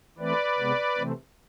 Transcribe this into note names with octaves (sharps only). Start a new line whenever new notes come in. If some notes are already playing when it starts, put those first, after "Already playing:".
E3 A3 C4 B4 D5
C3 G#3 B3
C3 E3 A3 C4